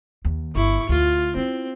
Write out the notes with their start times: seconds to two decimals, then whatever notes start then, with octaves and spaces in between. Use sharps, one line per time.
0.25 D#2
0.55 G1 E4 C#6
0.89 D2 F4
1.36 C4 E4